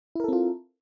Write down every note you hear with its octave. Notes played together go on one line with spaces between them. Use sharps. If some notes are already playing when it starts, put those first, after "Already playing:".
C4 E4 F4 A4 A#4